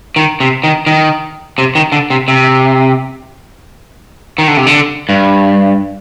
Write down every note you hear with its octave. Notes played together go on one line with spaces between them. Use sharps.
D#3
C3
D#3
D#3
C3
D#3
D3
C3
C3
D#3
D3
C3
D3
G2